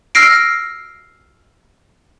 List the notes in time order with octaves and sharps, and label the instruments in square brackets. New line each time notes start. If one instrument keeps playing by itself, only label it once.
[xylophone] E6 F6 A#6 C7 D7